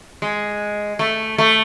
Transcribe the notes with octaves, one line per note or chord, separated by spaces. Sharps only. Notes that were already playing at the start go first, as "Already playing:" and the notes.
G#3
A3
A3